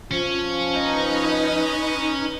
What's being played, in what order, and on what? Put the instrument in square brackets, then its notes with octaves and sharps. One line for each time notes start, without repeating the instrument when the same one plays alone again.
[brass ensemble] F3 [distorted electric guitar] C#4
[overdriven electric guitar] D#4 [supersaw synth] B4 D#5